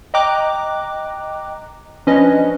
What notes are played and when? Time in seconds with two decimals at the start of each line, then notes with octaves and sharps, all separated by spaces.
0.14 D#5 G5 A#5 D6 F#6
2.07 F3 C#4 D4 B4 D#5